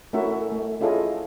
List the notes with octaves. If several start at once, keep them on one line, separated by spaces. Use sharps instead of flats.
A3 C#4 E4 F#4 A#4 E5
A3
C#4 E4 F4 G#4 A4 D#5